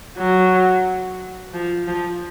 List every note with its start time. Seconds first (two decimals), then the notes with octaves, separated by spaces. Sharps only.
0.18 F#3
1.54 F3
1.88 F3